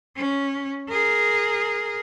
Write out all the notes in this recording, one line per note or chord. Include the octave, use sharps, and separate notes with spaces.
C#4
G#4 A#4